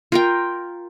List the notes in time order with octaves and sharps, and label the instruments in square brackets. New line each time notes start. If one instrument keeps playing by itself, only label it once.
[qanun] F4 A#4 G5